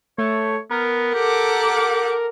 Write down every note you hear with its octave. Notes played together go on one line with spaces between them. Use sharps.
A3 C#5
B3 A#4
G4 A4 F#5 D6